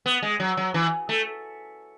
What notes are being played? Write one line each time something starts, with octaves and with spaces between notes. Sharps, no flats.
B3
G#3
F#3
F#3
E3
A3